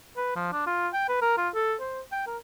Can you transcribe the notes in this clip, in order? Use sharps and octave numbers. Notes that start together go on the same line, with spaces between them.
B4
F3
D4
F4
G5
B4
A#4
F4
A4
C5
G5
A#4